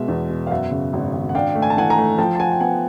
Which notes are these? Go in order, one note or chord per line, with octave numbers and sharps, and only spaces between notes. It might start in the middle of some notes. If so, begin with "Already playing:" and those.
Already playing: B2 G#3 E5
E2
B2
F5
F#2 E5 F#5
C#3
G#1
G#1
F#5
D4 F5 G5
A3
G#5
A5
E3 F#5 G#5
G#5 A#5
A3
F3 G5 A5
A5
F3 F#5 G#5
G5
B3 F#5 G#5